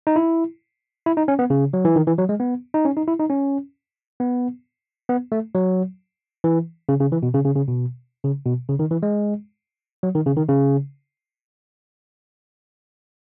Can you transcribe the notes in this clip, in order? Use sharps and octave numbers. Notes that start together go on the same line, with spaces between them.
D#4
E4
E4
D#4
C#4
B3
C#3
F#3
E3
D#3
E3
F#3
G#3
B3
D#4
C#4
D#4
E4
D#4
C#4
B3
B3
A3
F#3
E3
C#3
C#3
E3
B2
C#3
C#3
C#3
B2
C#3
B2
C#3
D#3
E3
G#3
F#3
D#3
C#3
D#3
C#3